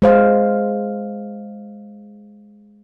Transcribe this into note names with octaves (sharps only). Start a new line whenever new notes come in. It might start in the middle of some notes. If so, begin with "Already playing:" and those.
G#3 C5 F5